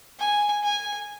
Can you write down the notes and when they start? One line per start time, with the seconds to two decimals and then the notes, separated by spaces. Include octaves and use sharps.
0.19 G#5
0.63 G#5